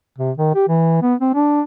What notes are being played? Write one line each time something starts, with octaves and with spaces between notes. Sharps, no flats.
C3
D#3
G4
E3
B3
C4
D4